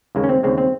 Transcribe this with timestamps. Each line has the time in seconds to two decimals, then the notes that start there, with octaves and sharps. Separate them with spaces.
0.15 D#2 C#3 G#3 A#3
0.24 C#4
0.29 C4
0.43 D#2 C#3 G#3 C4
0.58 C4